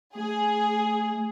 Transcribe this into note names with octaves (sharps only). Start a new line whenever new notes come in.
A3 G#4